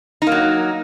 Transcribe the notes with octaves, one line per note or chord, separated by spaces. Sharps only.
F#3 A#3 D#4